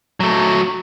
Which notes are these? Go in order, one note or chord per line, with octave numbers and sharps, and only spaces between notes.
F#3 A3